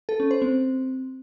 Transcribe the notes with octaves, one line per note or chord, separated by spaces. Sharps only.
A4
C#4
C5
C4